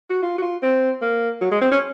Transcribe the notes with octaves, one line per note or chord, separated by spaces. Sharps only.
F#4
F4
F#4
F4
C4
A#3
F#3
G#3
C4
C#4